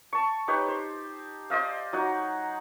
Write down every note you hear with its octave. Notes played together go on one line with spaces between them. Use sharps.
A5 C#6
D#4 G4 B4 C#5
C5
C5 D5 D#5 F5
F#3 D#4 F#4 F#5